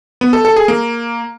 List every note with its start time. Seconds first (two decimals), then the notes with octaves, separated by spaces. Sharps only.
0.21 B3
0.33 A4
0.45 A4
0.56 G#4
0.68 A#3